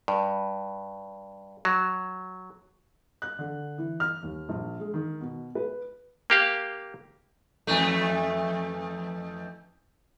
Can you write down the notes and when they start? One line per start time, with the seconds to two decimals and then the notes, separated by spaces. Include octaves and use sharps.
0.08 G2
1.65 F#3
3.22 F#6
3.39 D3
3.78 E3
4.00 F6
4.23 D#2
4.49 A#1
4.80 G#3
4.94 D#3
5.21 B2
5.55 B4
6.30 A#3 G4 F5
7.67 F2 E3 A3